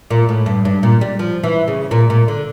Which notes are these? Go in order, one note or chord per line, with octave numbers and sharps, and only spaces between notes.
A#2
A2
G2
G2
A#2
G3
F3
E3
C#3
A#2
A#2
D3